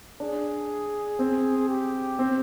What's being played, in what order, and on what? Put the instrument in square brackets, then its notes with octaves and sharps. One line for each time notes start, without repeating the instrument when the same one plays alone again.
[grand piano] D4 [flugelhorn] G#4
[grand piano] C4
[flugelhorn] G4
[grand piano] C4